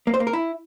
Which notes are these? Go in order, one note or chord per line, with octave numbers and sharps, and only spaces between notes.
A#3
C5
A#3
A#4
E4